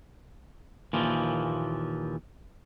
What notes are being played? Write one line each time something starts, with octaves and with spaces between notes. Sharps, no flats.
D#2 A#2 E3 F3